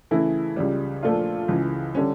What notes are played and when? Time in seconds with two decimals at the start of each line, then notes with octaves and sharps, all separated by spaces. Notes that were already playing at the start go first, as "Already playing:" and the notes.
0.11 C#3 E3 A3 E4
0.56 C#2 C#3 G3
1.03 A#2 F3 A3 D4 F4
1.48 C#2 C#3 E3
1.95 D3 G3 C#4